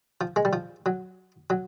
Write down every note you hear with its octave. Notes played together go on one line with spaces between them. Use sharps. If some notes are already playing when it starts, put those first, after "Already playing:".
F3
G#3
G3
F3
F#3
F#3